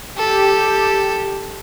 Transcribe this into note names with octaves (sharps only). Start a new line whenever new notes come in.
G4 A4